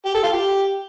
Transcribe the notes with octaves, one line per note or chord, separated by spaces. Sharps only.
G4
A4
F4
G4